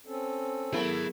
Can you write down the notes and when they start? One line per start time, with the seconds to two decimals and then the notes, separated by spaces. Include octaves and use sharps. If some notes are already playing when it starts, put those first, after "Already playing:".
0.07 C4 C#4 A4
0.73 F#3 A3 B3 E4 G#4 A#4 B5